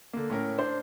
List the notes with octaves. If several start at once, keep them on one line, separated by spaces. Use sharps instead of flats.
D3 A#3
A2 C#4 A#4
D4 C5